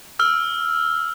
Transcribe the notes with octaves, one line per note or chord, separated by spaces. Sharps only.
E6 F6